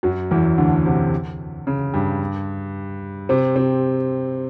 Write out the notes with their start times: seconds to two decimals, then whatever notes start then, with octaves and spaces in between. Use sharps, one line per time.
0.03 F#2 F#3
0.31 E2 E3
0.58 D2 D3
0.85 C3
1.67 C#3
1.94 G2 G3
3.29 C3 C4
3.56 C3 C4